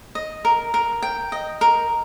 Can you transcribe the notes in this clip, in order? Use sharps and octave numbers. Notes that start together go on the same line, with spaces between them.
D#5
A#4
A#4
G5
D#5
A#4